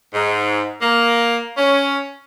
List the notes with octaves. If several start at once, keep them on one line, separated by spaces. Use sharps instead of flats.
G#2
A#3
C#4